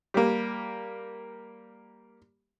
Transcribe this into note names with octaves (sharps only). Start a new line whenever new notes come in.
G3 A#3